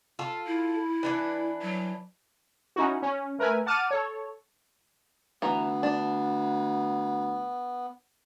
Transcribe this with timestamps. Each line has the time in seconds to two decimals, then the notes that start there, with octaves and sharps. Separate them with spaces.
0.19 F4 A4
0.47 E4
1.03 E3 D4 B4
1.62 F#3
2.76 C#4 D#4 E4 F#4
3.02 C#4
3.39 A3 A#4 B4 E5 G#5
3.66 F#5 A5 D6 F6 A6 D#7
3.91 A4 C#5
5.42 D2 E3 B3 A#5
5.83 D4